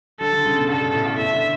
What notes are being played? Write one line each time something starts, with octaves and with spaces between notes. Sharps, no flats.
D3 A4
D3
C#3
B2
G2 A4
A2
G2
B2 E5
D3